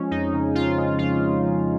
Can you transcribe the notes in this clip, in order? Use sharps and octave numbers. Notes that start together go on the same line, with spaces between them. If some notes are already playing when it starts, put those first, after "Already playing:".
Already playing: F3 G#3 C#4
F2 D#4
C#3
F3 F4
G#3
F2 F4
C#3
F3